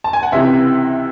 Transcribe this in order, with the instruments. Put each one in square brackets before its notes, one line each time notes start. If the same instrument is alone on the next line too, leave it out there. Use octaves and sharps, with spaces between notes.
[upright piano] A5
G#5
F#5
C#2 C3 E3 E5